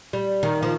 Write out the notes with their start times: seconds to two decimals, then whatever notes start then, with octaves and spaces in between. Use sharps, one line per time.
0.13 G3
0.43 D#3
0.63 F3